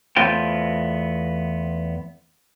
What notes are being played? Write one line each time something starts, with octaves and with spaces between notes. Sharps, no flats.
E2 A3 B3 C4 F4 G5